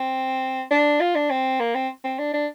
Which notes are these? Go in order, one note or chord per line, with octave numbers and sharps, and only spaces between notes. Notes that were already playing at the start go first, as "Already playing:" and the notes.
Already playing: C4
D4
F4
D4
C4
A#3
C4
C4
D4
D4